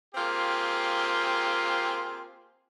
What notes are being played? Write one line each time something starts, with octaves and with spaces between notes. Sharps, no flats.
A#3 C4 F4 G4 G#4